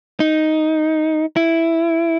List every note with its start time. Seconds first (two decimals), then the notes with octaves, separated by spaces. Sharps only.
0.20 D#4
1.36 E4